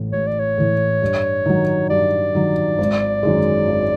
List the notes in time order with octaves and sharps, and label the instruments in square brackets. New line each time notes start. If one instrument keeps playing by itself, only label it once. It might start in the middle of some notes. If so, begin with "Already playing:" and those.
Already playing: [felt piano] A1 A2 E3
[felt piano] A1 [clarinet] C#5
[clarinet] D5
C#5
[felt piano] A2 E3
G2
D#3 F#3
[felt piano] G2 [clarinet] D5
[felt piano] D#3 F#3
G#1
F#2 D#3 G#3
G#1